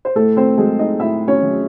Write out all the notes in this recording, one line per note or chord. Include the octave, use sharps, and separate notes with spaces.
C5
A2 A3 A4
C4 C5
F#3 G#3 G#4
D#4 D#5
A2 E4 E5
C#4 C#5
F#3